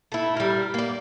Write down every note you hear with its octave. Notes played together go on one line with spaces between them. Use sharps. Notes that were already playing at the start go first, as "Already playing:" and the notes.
A3 E4
G3 A#4
A#3 D5